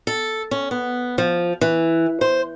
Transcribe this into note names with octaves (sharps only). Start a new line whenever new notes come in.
A4
C#4
B3
F3
E3
C5